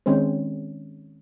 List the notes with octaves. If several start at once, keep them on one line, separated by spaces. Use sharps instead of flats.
D#3 G#3 C4 C#4 C5